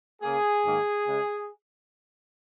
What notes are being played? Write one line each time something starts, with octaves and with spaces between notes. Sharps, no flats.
C#3 A#3 G#4
G#2 D#3 A#3
C#3 G#3